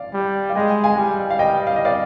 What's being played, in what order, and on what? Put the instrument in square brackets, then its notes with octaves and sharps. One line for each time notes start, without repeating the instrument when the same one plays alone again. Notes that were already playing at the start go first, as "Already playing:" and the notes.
Already playing: [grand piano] D5 F5
[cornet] G3
[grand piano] F5
[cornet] G#3 [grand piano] D#5 G5
[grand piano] F5 G#5
[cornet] G3
[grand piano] F5
D#5 G5
F5
D#5
D5 F5